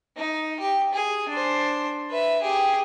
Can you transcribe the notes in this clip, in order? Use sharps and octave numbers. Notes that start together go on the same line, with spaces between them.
D#4
G4
G#4
D4 C5
B4 E5
G4 G#4